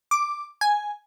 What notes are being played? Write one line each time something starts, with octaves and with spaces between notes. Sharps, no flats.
D6
G#5